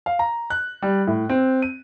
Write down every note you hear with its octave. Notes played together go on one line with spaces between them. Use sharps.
F5
A#5
F#6
G3
A2
C4
D#7